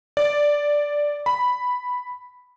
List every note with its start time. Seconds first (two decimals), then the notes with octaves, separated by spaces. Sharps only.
0.17 D5
1.26 B5